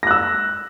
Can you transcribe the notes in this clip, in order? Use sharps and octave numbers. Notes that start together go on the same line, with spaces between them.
E6 F#6 A#6